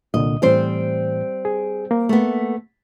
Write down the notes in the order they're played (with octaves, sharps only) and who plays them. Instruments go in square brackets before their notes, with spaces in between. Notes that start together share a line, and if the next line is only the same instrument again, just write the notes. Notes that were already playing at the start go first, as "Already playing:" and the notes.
[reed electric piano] C2 A#2 D3 [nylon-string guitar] D#5
[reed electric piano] A2 E3 [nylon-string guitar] G3 C4 C5
[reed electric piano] G#4
A#3
[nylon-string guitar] A3 B3